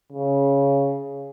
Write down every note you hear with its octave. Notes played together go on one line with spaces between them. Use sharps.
C#3